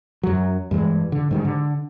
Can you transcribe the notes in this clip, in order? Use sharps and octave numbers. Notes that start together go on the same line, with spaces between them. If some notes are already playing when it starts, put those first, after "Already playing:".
F#2 F#3
G2 E3 G#3
D3
G#2 D#3 G3
D3